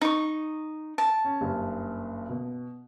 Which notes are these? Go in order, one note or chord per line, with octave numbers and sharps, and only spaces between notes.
D#4 C#6
A5
C#4
F#1 G2
B2